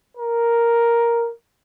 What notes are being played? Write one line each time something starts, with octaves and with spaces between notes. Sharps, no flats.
A#4